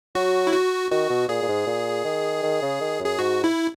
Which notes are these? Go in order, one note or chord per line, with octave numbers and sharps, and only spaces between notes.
F#3 F#4
E4
F#4
D#3 F#4
B2
A#2 G#4
A#2
G#2
A#2
D#3
D#3
C#3
D#3
F#2
G#4
G#2 F#4
E4